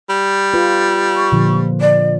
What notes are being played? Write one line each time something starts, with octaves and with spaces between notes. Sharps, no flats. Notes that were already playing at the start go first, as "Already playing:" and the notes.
G3
F4 B4
C#6
A#2 D3 F3
D5